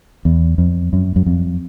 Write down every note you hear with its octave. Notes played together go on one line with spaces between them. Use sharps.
E2
F2
F#2
F#2
F2